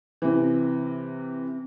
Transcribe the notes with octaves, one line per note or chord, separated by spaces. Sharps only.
C3 E3